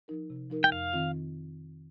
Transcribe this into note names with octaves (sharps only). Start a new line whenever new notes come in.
F3 D#4 A#4
C3
F3 D#4 A#4
G5
F2 F5
D#3 C4 F4